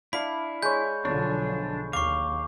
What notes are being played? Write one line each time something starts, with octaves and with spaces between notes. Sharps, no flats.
D4 E4 F5 B5
G#3 C#5 G6
B1 D3 F3 D4 C#5
D#2 F5 C#6 D6